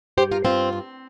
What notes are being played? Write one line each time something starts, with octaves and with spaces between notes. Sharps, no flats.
G2 G4 C5
F4 A#4
G2 C4 F4
C4